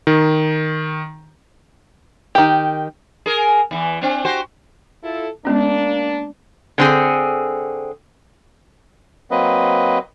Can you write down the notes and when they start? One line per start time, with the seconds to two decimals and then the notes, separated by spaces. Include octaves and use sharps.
0.07 D#3
2.35 D#3 G4
3.26 G#4 A#4
3.71 E2 E3
4.02 C4 D4
4.25 F#4 G4 C5
5.03 E4 F4 A4
5.45 G#3 A#3 B3 C#4 D4
6.78 D3 C4 G#4
9.31 F#3 A#3 C4 B4 D#5